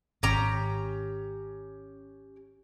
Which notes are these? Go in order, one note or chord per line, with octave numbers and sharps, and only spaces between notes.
G#1 C#4 G4 A#5